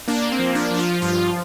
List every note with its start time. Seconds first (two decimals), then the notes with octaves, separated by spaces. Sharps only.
0.08 A#3 D4
0.32 C4
0.39 F3
0.55 D4
0.71 F3 D4
0.79 F4
1.02 G2 F4